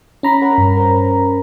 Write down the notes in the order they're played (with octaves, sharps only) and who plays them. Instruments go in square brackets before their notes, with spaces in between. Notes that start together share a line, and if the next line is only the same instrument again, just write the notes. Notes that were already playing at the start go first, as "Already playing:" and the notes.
[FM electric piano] C#4 A#5 B5
[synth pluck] A#4 C#5 F#5
G2
A#4 C5